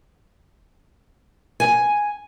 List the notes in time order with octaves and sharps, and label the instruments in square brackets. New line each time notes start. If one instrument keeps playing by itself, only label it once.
[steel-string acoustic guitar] G#5